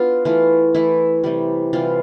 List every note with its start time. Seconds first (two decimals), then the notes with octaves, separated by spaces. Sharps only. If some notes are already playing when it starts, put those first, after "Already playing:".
Already playing: B3 D4 F4
0.25 E3 A3 F4
0.74 E3 A3 E4
1.24 C3 E3 G3
1.73 C3 E3 G3 F4